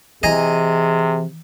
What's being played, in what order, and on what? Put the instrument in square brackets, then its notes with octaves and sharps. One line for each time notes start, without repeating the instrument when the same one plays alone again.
[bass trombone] C3 [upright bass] E3 [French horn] G#4 [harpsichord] D#5 G#5 A#5